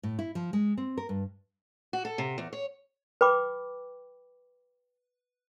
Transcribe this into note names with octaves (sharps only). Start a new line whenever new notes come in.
A2
E4
F3
G#3
C4
A#4
G2
F#4
A4
C3
E2
C#5
B4 G5 B5 D6